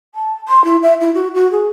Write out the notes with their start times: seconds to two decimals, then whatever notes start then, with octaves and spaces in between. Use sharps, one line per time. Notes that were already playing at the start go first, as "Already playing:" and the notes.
0.15 A5
0.48 C6
0.64 E4
0.82 E5
1.00 E4
1.14 F#4
1.34 F#4
1.51 G#4